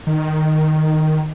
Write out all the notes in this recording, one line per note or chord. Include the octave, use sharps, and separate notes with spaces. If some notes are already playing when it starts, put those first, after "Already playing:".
D#3